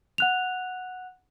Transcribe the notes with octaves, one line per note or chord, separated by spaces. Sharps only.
F#5 F#6 F7